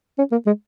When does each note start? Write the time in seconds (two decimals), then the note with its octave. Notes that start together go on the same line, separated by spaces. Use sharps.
0.18 C#4
0.32 A#3
0.46 G#3